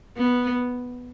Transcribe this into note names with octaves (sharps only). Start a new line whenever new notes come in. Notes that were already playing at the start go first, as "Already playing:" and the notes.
B3